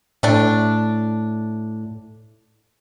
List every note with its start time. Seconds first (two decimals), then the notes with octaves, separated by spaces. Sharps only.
0.23 A2 A3 D4